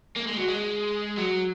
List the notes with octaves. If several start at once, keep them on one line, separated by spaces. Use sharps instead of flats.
A#3
G#3
F#3
G#3
F#3